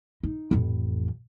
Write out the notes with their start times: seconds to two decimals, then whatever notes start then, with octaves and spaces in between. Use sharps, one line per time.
0.23 D#4
0.51 A1 F2